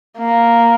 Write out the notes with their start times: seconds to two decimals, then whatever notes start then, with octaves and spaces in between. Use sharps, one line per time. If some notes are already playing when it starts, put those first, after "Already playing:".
0.18 A#3